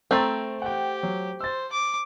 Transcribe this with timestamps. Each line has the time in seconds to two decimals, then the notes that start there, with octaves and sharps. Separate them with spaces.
0.11 A3 C4 G5 A#5 A6
0.62 G4 F#5 G5
1.03 F#3
1.40 C5 E6 A6
1.72 D6